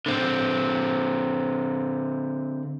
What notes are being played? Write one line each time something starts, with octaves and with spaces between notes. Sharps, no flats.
D3 C4